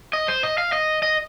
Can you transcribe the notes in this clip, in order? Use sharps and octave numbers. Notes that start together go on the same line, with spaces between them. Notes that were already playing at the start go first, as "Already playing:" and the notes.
D#5
C5
D#5
F5
D#5
D#5